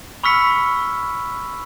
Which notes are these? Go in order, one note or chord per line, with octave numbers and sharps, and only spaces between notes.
B5 C#6 E6 F6 B6 C#7